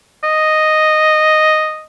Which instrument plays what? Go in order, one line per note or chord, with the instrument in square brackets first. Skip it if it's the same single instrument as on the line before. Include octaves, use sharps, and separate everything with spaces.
[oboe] D#5